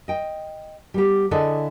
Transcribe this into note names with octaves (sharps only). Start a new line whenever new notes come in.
D#5 G5
G3 B3 G4
D3 E4 G#4 A4 D5 D#5